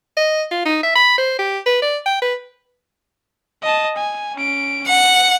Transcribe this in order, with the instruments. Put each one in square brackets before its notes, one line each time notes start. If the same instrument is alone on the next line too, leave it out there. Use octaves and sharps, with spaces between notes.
[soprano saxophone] D#5
F4
D#4
E5
B5
C5
G4
B4
D5
G5
B4
[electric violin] D#5 A5
G#5
C#4 D7
[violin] F#5 [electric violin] C#7